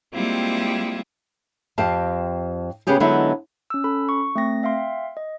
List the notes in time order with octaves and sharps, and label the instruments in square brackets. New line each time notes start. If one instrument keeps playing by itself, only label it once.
[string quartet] G3 G#3 A#3 C4 E4 F4
[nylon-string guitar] F2 C4 G4 F5 A5
C#3 B3 C#4 G4 G#4
D3 F#3 G#3 B3 D#4 E4
[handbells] C#4 E6
C#4 A4 B5
C#6
A3 C4 A#6
E5 F5 G5 C6
D#5